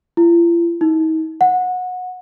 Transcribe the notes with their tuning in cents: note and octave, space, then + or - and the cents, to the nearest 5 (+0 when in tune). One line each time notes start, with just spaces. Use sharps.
F4 -45
D#4 +40
F#5 -20